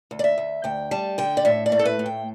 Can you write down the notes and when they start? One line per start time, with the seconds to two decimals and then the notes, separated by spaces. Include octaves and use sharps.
0.11 D2
0.19 D5
0.24 E5
0.38 D2
0.64 D2 G5
0.91 G3 A5
1.18 D3 G5
1.37 D5
1.45 A2 E5
1.66 D5
1.72 A3
1.79 A4
1.85 B4
1.99 A2
2.06 G5